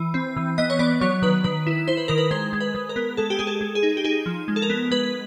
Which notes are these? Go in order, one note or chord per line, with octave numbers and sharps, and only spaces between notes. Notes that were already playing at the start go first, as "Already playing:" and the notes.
Already playing: E3
C4
E3
B3 D#5
C#5
B3 D5
F#3 C#5
D#3 B4
D#3 B4
E4
E4 C5
B4
D#3 A#4
B4
G#3 C5
G#3
B4
G#3
A#4
B3
G#3 A4
G4
G#3 G#4
A4
G#3
G#4
D#4
G4
D#4 G#4
F3
G#3
A4
A#4
B3
G#3 B4